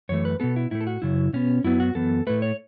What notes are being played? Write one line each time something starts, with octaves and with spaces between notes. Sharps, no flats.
F#2 E3 A3 C#5
B4
B2 B3 A4
E4
A2 A3 E4
A4
F#4
F#2 C#3 F#3 E4
B2 B3 C#4
F#2 F#3 B3 E4
F#4
F#2 E3 B3 A4
A2 A3 B4
C#5